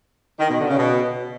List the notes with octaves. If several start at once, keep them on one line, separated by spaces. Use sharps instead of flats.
D#3
B2
D3
C#3
B2